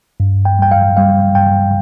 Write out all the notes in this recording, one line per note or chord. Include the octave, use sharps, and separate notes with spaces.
G2
G5
G3 G5
F5
G3 F5
G2 G5